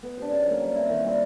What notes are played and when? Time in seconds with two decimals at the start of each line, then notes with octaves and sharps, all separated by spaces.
0.03 B3
0.17 D4 G4 C5
0.31 C#3
0.46 F#3 A#3
0.61 G3
0.75 C4 E4
0.90 D#3
1.04 G3 C4